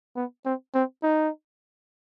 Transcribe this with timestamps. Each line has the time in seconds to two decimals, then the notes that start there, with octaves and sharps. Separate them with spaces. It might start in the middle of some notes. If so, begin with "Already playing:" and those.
0.16 B3
0.46 C4
0.75 C4
1.03 D#4